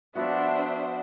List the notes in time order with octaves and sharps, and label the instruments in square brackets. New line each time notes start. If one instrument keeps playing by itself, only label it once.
[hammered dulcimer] F3 B3 F#4 [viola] D4 C5 [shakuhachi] E5